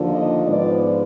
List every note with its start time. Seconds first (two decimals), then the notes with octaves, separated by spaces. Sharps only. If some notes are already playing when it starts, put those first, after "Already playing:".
Already playing: D#2 D3 F3
0.10 D#5
0.46 G#2 F3 G#3 B3 D5